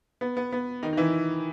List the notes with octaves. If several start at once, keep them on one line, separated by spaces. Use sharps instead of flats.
B3
B3
B3
D#3 D#4
D#4
E3 E4